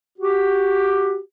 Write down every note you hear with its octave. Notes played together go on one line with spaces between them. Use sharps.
F#4 G4